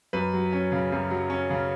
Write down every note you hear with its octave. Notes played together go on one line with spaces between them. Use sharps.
F#2 B4
F#3
C#4
C#3
F#2
F#3
C#4
C#3